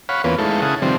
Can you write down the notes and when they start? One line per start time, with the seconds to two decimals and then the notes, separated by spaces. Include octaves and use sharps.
0.09 C#5 F5 F#5 B5
0.24 E2 A#3 B3 C#4 F4 B4
0.38 G#3 A3 D#4 E4 A4 F5
0.62 C#3 E4 G#4 F#5 A5 D#6
0.82 C3 D#3 F3 G3 C4 D4